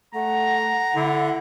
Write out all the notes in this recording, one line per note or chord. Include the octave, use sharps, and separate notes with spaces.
A3 F#5 A#5
D3 E4